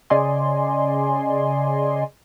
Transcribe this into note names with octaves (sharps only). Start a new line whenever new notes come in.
C#3 D5 D#5 G#5 C6